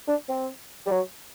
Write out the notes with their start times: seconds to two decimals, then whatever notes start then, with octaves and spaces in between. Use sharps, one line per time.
0.08 D4
0.29 C4
0.86 G3
0.91 F#3